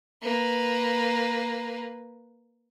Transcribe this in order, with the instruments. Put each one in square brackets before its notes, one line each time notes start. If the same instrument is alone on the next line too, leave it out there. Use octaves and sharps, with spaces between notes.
[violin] A#3 B4